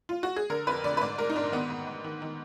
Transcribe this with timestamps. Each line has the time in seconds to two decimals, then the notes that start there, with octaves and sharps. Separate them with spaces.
0.09 F4
0.23 F#4
0.36 G#4
0.50 D3 A#4
0.67 F2 B4
0.84 D3 D5
0.97 B4
1.01 G#2 D5
1.18 G#2 A#4
1.30 D#4
1.36 G#2 D4
1.52 D#3 B3
1.70 G#2
1.87 G#2
2.04 D#3
2.22 D#3